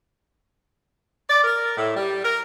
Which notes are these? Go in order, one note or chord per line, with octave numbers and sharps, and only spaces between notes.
D5
A#4
A2
G3
A#4